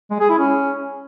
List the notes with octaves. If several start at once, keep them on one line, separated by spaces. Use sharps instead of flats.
G#3
G#4
E4
C#4